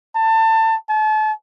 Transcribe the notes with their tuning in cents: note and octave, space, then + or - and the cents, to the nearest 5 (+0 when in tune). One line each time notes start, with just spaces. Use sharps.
A5 +25
A5 -35